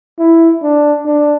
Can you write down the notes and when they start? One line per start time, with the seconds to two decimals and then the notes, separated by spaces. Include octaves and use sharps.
0.19 E4
0.63 D4
1.06 D4